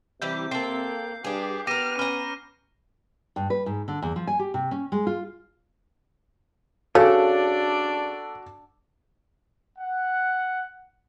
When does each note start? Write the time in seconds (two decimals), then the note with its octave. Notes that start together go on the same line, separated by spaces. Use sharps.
0.22 C3 E3 G3 G4 G6
0.51 A#3 C4 A4 C7
1.24 G2 D4 G4 G#4
1.67 B3 G4 A#4 D6 F6 A#6 D#7
1.99 C#4 B4 A#5 F6
3.36 G2
3.50 B4
3.66 G#2
3.88 D3
4.02 E2
4.16 F3
4.27 G#5
4.39 G4
4.54 C3
4.71 C#4
4.92 G#3
5.07 F4
6.95 C#3 D4 F#4 A4 D5
9.79 F#5